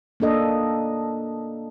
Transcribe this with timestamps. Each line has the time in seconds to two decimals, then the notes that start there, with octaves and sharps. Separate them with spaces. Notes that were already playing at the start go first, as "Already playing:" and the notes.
0.20 A#3 D4 A4 D#5